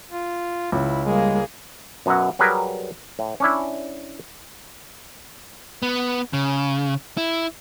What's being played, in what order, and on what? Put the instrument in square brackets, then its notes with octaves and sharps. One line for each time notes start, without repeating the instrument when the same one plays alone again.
[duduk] F4
[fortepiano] C#2 [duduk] E4
[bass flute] G3 [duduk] G#3 [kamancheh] A#3 G#4
[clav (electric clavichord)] F#2 B2 F#3 D#5 E5 F#5
F#3 G3 G#4 A#4 B4
A2
C#4 D4 E4
[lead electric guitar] B3
C#3
E4